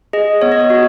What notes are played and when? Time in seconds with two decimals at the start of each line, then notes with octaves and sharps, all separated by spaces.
0.13 G#4 D#5
0.41 B3 C#5
0.52 D#5
0.61 C#5
0.70 F#4